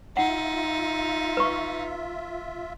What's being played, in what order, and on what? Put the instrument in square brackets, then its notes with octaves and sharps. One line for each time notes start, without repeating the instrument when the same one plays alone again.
[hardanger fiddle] D#4 [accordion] F4 E5 [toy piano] F#5
[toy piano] B4 C#6